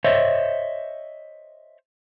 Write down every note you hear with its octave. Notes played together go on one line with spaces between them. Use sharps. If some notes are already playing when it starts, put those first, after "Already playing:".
C5 C#5 D#5 E5